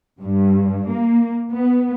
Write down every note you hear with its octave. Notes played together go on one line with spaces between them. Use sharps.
G2
A#3
B3